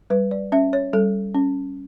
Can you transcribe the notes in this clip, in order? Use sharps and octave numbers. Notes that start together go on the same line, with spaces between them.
G3 B4
D5
C#4 E5
C#5
G3 A4
C#4